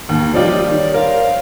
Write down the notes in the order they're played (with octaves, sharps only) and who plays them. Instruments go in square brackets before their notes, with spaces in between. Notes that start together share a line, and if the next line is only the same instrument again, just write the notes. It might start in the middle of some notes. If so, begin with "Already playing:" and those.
[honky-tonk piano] D#2 [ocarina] A#3
[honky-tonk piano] F3 D#4 F4 [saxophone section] G3 D5 [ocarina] C#5
[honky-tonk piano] D#3
[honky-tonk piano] A#4 [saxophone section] C5 F5